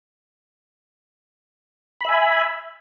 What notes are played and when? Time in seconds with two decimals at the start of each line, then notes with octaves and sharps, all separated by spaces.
2.01 B5
2.05 E5
2.09 G#5